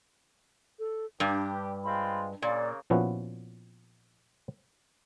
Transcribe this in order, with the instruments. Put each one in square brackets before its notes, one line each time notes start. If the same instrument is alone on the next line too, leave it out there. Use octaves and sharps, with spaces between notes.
[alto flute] A4
[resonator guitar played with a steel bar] G2 [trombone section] G3 D4 G4 [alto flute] B4
[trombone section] G#3 C4 F4 [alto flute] B5
[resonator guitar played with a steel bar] A#2 [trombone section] C#3 A#3 [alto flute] D5
[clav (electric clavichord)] A#2 F3 B3 C#4 E4 F#4